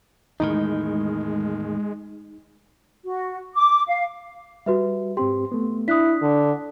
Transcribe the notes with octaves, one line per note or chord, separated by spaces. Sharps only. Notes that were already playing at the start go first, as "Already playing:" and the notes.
E2 A2 D#3 G#3 D#4
F#4
D6
F5
G3 F#4 B4 E5
G#2 C4 G4 C6
A3 B3
D4 E4 D#6 F#6 B6
D3